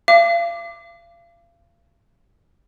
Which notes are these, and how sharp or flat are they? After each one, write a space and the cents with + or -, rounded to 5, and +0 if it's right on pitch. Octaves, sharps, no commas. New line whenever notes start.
F5 -40 D6 +0